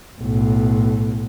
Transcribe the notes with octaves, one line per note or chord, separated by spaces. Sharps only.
B1 A2